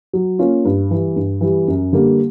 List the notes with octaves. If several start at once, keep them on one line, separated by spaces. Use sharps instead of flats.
F#3
A#3 C#4 F4
G2
E3 G3
G2
E3 G3
F#2
D3 G3 A#3